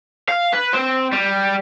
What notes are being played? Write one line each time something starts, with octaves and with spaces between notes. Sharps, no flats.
F5
B4
C4
G3